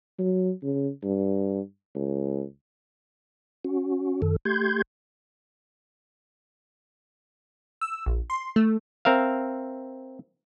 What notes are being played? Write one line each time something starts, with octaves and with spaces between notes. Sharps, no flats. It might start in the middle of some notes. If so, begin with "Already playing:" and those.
F#3
C#3
G2
C#2
C#4 F#4
F#2 D#3 A4
A3 G4 C6 G6 G#6
E6
A#1
C6
A3
C4 A#4 E5 F5